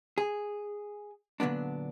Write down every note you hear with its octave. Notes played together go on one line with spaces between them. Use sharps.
G#4
A#2 D3 F#3 B3 D4